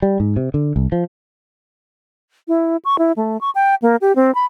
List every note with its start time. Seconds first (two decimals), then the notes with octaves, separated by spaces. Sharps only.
0.02 G3
0.20 G#2
0.37 C3
0.54 D3
0.76 C2
0.92 F3
2.48 E4
2.85 C#6
2.99 E4
3.16 A3
3.41 C#6
3.55 G5
3.82 A#3
4.01 G4
4.16 C4
4.35 B5